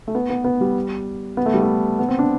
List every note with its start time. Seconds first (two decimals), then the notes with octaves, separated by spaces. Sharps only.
0.08 A3
0.15 B3
0.30 B3
0.44 B3
0.61 G3
1.37 B3
1.46 A3
1.54 G3
1.63 A3
1.99 B3
2.09 C4
2.19 D4